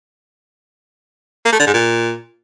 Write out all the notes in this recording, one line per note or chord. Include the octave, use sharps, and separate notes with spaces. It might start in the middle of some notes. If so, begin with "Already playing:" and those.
A#3
A3
D3
G#2
A#2